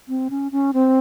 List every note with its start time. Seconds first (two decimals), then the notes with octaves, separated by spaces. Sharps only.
0.09 C4
0.30 C#4
0.52 C#4
0.73 C4